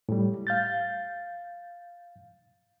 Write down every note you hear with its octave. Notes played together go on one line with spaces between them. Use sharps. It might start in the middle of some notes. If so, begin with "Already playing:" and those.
A2 G3
F5 G6 A6